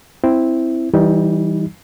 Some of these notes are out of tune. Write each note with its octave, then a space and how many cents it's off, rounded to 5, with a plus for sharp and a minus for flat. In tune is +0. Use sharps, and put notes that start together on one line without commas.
C4 +0 E4 +0
E3 -10 G3 -10 D#4 +20